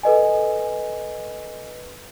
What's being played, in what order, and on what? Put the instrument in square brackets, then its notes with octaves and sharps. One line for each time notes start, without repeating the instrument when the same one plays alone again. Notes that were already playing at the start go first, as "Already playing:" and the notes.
[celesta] A4 B4 D#5 G#5